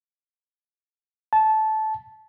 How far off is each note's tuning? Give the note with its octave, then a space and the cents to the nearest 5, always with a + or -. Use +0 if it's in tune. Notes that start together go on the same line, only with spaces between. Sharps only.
A5 -15